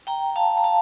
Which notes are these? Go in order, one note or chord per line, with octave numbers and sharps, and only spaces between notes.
G5 A#5
F5 A5
A#5
F5 A5